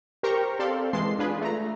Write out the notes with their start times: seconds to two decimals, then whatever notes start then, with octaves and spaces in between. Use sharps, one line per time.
0.23 G4 A#4 C5 G5 A#5 C#6
0.59 C4 G4 A4 D5 F5 C6
0.93 E3 G#3 A5 C6 C7
1.19 D4 F4 G#4 B4
1.41 A3 A#5